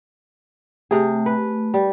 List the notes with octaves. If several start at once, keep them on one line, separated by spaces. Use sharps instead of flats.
C3 A3 G#4
B4
G3